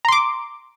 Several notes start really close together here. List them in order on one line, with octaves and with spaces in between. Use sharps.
A#5 C6 D6